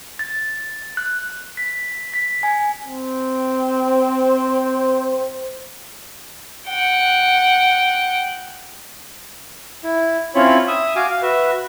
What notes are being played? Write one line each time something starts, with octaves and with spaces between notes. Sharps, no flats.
A6
F#6
B6
B6
G#5
C4
C5
F#5 G5
E4
C4 C#4 E4 F4 C#5 B5
E5 D#6
F#4 F5 G#5 D6
F5
F#4 B4 E5